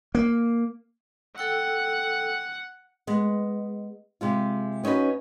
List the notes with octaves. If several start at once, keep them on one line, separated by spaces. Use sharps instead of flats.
A#3
A4 F#5 G5 E6
G#3 B3
C3 G#3 F4
B3 C#4 D#4 F#4 B4